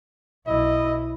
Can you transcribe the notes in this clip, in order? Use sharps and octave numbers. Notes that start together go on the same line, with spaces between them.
B1 E4 D#5